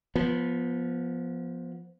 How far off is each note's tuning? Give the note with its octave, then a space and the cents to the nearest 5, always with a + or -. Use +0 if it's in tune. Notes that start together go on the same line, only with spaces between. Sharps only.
F3 +0 B3 -20